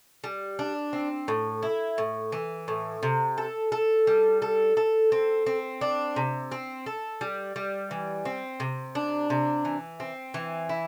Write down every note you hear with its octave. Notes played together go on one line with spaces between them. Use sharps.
G3
D4
C4
A2
E4
A2
E3
A2
C3
A4
A4
G3
A4
A4
C4
C4
D4
C3
C4
A4
G3
G3
E3
C4
C3
D4
C3
E3
C4
E3
E4